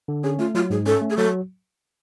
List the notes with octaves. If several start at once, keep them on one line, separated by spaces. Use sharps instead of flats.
D3
C#4 G#4
A3 F4
F#3 F4
G#2 G#4
C#4 A4
A3
G#4
F#3 A4